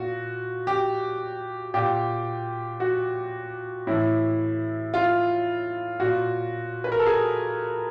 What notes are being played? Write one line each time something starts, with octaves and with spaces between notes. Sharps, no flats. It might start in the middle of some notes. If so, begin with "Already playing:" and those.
Already playing: A#2 F#4
G4
A#2 G4
F#4
A2 E3 E4
F4
A#2 F#4
B4
A#4
A4
G#4